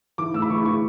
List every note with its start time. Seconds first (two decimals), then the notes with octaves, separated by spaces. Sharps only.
0.18 E3 D6
0.34 A2 E6
0.42 B5
0.50 E3 C#6
0.65 E3 C#6